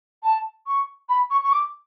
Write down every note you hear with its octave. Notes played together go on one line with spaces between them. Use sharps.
A5
C#6
B5
C#6
C#6
D6